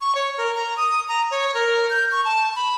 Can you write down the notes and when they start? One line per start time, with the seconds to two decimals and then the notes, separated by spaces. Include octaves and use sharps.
0.01 C#6
0.15 C#5
0.38 A#4
0.55 A#5
0.77 D#6
1.08 A#5
1.31 C#5
1.54 A#4
1.90 G6
2.12 C#6
2.25 A5
2.56 B5